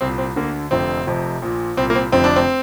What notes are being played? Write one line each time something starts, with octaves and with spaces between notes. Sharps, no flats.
C2 A#2 C4
C4
D2 D3 A#3
F1 F2 D3 C4
F1 F2 C3
A#1 A#2
C2 A#2 C4
A#3
C4
F1 F2 D3 C4
D4
C4